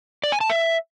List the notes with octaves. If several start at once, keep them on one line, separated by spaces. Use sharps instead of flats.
D5
G#5
A5
E5